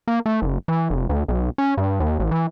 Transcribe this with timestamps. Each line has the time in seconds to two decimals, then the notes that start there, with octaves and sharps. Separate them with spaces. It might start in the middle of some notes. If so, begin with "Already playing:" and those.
0.08 A#3
0.26 A3
0.42 F#1
0.68 E3
0.90 F1
1.09 D2
1.28 B1
1.58 C#4
1.77 G2
2.00 D#2
2.20 A1
2.31 E3